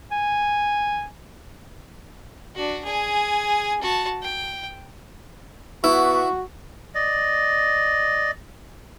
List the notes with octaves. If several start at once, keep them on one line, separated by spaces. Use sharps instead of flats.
G#5
D4 F#4
G#4 G#5
F#4 A5
G5
B3 E4 F#4 C#6
D5 D#5